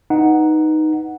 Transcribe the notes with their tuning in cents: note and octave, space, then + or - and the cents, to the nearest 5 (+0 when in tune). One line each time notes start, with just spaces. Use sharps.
D#4 +0 B4 +0 F#5 +0